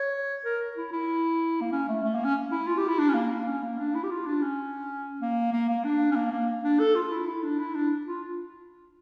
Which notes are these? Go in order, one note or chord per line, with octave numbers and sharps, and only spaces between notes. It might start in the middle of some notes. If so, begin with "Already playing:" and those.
Already playing: C#5
A#4
E4
E4
A#3
C#4
A3
A3
A#3
C#4
E4
F4
G4
E4
D4
C#4
A#3
C#4
A#3
D4
E4
G4
F4
D4
C#4
A#3
A#3
A#3
D4
C#4
A#3
A#3
D4
A4
F4
E4
E4
D4
E4
D4
F4